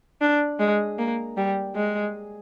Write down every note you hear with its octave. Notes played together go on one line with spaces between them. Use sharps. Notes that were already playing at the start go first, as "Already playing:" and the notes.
D4
G#3
A#3
G3
G#3